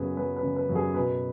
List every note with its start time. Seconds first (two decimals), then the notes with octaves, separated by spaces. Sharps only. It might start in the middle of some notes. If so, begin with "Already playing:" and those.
Already playing: F#2 C#3 B3 G#4 B4
0.17 F#3 B4
0.36 B4
0.43 C#3
0.56 B4
0.69 F#2
0.75 G#4
0.94 B2 B4